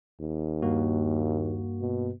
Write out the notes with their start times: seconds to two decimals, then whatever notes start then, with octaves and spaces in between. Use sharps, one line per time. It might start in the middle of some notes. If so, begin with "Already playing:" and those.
0.20 D#2
0.62 G2 A#3 F#4
1.81 B2